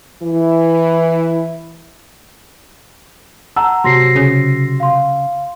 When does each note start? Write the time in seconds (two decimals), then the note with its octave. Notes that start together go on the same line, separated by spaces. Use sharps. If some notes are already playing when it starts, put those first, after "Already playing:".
0.23 E3 E4
3.56 F#5 A5 A#5 E6
3.84 C3 F#3 C6 A#6 C7
4.16 C#3
4.80 F5 C6